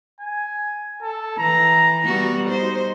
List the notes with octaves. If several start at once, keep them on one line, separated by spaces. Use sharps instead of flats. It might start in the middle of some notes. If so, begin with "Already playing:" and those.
G#5
A4
E3 A#5
G3 B3 F#4
D#4 C5